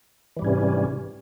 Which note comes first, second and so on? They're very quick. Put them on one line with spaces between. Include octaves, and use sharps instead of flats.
E3 G3 G#2 C#4 C3